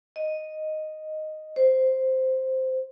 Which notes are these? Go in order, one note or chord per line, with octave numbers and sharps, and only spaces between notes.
D#5
C5